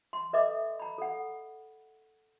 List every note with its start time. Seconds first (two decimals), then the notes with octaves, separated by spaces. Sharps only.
0.13 C6
0.33 A4 B4 D#5 E5 D6
0.79 A#5 B5
0.98 A4 F#5